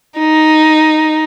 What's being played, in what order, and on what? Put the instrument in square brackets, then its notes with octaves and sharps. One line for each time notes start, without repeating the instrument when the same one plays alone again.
[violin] D#4